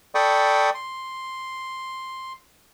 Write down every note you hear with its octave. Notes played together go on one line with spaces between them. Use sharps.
A4 D5 G5 B5 C#6 D#6
C6